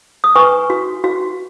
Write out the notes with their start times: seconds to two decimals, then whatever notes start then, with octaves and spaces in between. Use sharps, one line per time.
0.24 D#6
0.35 B4 G#5 C#6
0.70 F#4
1.04 F#4